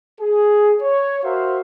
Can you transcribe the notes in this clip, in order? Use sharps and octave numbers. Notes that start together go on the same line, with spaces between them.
G#4
C#5
F#4 A#4 C5 E5 F5